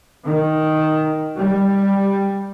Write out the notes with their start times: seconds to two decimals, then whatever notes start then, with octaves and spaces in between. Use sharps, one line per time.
0.25 D#3
1.37 G3